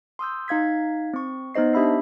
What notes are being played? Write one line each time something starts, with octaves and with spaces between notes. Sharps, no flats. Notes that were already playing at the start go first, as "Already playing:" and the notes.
C6 D#6 E6 G6
D#4 F5 G#6 B6
C4 C#6
B3 D#4 C5 D#5 C7
D4 G4 E5 B5 E6 C7